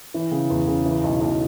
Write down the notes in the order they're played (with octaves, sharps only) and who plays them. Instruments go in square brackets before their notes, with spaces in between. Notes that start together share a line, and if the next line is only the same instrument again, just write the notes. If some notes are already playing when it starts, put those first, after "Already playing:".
[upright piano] E3
C#3
E2
C#3
E3
B1
B1